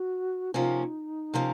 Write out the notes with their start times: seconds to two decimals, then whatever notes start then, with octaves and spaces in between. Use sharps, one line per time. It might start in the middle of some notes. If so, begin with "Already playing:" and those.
Already playing: F#4
0.54 C3 F3 A#3 C#4 D#4
1.34 C3 F3 A#3 C#4